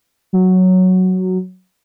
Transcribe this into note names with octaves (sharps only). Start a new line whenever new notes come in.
F#3